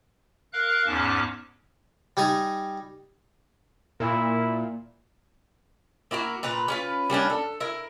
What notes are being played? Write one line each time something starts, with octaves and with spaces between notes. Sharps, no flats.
A#4 F5 F#6
E2 G#2 C#4 A5 D6
G3 D#4 G#5 A#5
A#2 E4
A#3 E4 F#4 A#4
A#2 B4 A#5
C#4 F4 B4
G3 A#3 C#4 D4
A4
E4 A#4